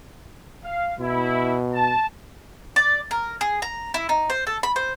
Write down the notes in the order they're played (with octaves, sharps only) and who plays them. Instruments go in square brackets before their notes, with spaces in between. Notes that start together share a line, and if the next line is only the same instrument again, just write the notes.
[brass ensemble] F5
[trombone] B2 [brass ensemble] E4
[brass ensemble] A5
[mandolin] D5
A#4
G#4
A#5
E4
D#4
C5
A4
B5
C5